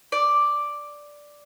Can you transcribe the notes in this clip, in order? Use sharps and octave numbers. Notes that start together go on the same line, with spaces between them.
D5